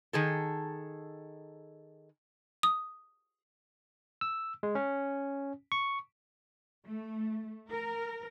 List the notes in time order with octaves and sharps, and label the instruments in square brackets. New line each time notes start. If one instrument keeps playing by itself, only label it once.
[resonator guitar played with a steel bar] D#3 G#4 A4
[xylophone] D#6
[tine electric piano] E6
G#3
C#4
C#6
[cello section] A3
A#4